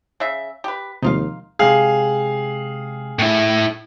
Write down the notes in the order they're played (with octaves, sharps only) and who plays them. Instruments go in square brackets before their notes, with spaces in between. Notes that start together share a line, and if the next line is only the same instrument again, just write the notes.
[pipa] C#3 E5
G4 B4
[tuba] D#2 [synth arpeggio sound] C3 F3 G#3 [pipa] D#4 F4 F5
[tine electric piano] C3 G#3 G5 [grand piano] G#4 F5
[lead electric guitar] A2 E4